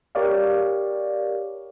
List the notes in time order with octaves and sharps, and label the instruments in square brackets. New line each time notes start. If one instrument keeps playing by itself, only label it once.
[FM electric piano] G4 A#4 C#5 D5 F5